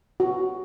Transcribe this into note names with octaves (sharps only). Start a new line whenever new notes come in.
F#4